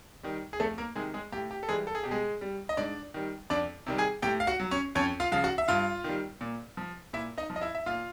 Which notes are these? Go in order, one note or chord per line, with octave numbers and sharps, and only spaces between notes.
D#3 G3
G#4
F2 A3 A4
A#3 A#4
C3 D#3 G#3 G#4
G#3 G#4
A2 G4
G4
A4
E3 G3 G#3 G#4
A4
G#4
B2 G4
G#3 G#4
G3
D#5
G#2 D4 D5
D#3 G3
F2 D4 D5
C3 D#3 G3
G#4 G#5
A2 G4 G5
F5
F#4 F#5
F#3
C#4 C#5
F2 C#4 C#5
F4 F5
C#3 F3 F5
F#4 F#5
E5
G2 F4 F5
D#3 G3
A#2
F3
A#2 E4 E5
D#4 D#5
F3
D#5
E4 E5
E5
A#2 F4 F5